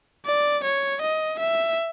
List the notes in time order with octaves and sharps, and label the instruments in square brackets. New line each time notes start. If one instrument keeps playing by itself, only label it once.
[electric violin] D5
C#5
D#5
E5